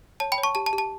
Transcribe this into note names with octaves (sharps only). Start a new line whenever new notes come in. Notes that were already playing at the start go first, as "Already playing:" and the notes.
C#5 A5
G5 B5
C#5
A5 C#6
G4 A5
A5
G4
A5